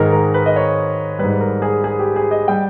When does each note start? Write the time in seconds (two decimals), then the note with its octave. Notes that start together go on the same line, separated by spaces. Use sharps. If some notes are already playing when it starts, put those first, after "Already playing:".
Already playing: G#2 D#3 G#3 A#4
0.12 A#4
0.34 B4
0.46 D#5
0.56 C#5
1.19 G#2 G3 B4
1.41 A#4
1.62 G#4
1.84 G#4
2.00 G4
2.16 G#4
2.31 D#5
2.48 G3 G5